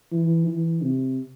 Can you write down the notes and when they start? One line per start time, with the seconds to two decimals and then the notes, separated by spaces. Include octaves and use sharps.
0.12 E3
0.47 E3
0.82 C3